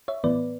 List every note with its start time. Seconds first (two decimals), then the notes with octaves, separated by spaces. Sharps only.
0.08 C#5 E5
0.24 A2 E3 B3 B4 D5